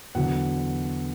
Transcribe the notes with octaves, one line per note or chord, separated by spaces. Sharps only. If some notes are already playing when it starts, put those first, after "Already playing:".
E2 D3 F#3 F#5